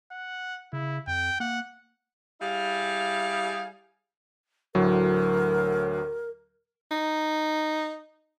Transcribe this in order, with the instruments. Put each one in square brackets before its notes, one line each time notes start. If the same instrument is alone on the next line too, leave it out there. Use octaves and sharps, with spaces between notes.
[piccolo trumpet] F#5
[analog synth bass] C#3 [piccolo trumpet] E4
[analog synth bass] F2 [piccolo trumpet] G5
[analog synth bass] A#3 [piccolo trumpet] F#5
[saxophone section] G3 E4 G#4 F5
[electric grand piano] D2 A2 F#3 [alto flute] A#4
[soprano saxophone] D#4